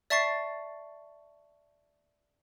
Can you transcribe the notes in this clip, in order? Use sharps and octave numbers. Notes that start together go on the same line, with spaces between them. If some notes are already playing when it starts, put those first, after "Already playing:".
D5 E5 A5 C#6 A6 C7